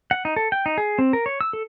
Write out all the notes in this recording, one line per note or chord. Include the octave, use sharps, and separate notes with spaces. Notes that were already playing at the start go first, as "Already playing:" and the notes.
F#5
D#4
A4
G5
D#4
G#4
C4
A#4
C#5
E6
A4